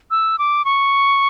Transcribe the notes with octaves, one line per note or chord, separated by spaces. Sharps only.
E6
D6
C#6